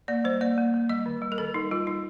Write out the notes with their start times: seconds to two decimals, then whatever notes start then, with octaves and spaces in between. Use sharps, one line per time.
0.08 A#3 D5
0.24 G3 C5
0.41 A#3 D5
0.58 A#3
0.74 A#3
0.89 G3 D#5
1.06 D#3
1.22 G3
1.32 A#4
1.38 D#3 A4
1.54 G3 D#4
1.71 G3 F4
1.87 G3 D#4